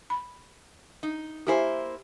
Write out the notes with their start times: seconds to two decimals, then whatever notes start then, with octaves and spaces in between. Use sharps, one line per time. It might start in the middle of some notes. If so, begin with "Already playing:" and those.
0.10 B5
1.03 D#4
1.47 A#3 E4 G4 C5 G#5